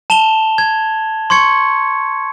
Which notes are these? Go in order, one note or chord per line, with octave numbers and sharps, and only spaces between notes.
A5 E7 F7 G7
G#6
C6 C#6 G#6 C#7